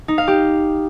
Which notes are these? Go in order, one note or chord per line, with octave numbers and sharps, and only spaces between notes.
D#4
F5
G4